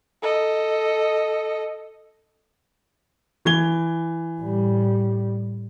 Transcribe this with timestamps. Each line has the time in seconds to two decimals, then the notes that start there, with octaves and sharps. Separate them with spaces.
0.22 A4 D#5
3.45 E3 G#6 G7
4.40 A2 G3